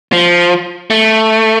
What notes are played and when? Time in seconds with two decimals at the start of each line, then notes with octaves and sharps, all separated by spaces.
0.13 F3
0.90 A3